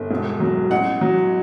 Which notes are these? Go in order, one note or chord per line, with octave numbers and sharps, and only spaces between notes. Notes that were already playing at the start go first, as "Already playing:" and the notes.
Already playing: G1
E1
F#3
A1 F#5
F#3